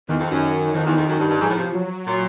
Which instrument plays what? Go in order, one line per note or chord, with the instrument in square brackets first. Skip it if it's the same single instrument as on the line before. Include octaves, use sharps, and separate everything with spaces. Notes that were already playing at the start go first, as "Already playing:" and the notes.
[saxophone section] E2 [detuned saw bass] D#3
[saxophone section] F2
F#2
[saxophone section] F2 [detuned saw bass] D#3
[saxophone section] E2
F2
F#2
G2
G2
[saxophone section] G#2 [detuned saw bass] F3
[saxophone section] A2
C3
[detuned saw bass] F#3
[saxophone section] A#2